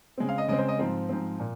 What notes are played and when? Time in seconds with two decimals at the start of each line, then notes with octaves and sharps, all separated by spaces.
0.18 C#3 G#3 C4
0.29 F5
0.38 D#5
0.48 C#3 G#3 C4 D#5
0.59 C5
0.68 D#5
0.79 G#2 F3 C4 C5
1.09 G#2 F3 C4
1.40 A#2